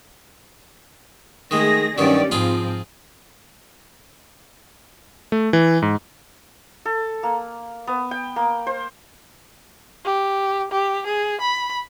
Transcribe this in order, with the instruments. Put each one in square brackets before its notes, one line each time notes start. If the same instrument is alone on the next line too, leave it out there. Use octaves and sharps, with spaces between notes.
[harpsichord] D#3 G#3 [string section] A3 G#4 A#6
[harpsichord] G2 D#3 F#3 [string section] C#4 G4 D5
[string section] G#2 F3 C4 [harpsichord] F4 G#4 B5
[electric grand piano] A3
E3
G#2
[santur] A4
A#3
B3
G5
A#3
C5
[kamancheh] G4
G4
G#4
B5